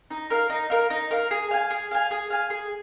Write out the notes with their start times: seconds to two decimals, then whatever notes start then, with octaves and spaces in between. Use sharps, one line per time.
0.11 D#4
0.30 A#4 F5
0.50 D#4
0.70 A#4 F5
0.90 D#4
1.11 A#4 F5
1.31 G#4
1.51 F5 G#5
1.70 G#4
1.91 F5 G#5
2.11 G#4
2.30 F5 G#5
2.50 G#4